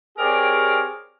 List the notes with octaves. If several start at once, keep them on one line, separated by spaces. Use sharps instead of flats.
C4 G4 G#4 A#4 C#5 D5